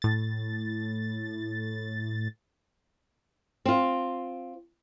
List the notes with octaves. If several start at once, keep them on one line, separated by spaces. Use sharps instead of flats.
A2 A6
C4 F4